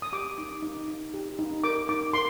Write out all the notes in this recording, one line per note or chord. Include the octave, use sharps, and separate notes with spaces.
D#6
G4 D6
D#4
D#4
D#4
G4
D#4
A#4 D6
D#4 D6
A#4 C6